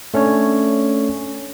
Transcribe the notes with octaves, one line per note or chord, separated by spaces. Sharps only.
A3 C#4 D4 C#5